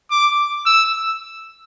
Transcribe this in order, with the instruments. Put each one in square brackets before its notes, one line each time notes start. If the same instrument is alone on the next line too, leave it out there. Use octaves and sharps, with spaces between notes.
[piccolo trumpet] D6
E6